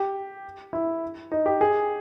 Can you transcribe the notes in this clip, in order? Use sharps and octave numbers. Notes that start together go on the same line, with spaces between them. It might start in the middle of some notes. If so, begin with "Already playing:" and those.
Already playing: G4
E4
D#4
G4
G#4